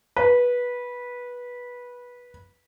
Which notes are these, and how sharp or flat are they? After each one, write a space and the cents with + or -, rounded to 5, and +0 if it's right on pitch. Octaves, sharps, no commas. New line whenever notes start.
B4 -15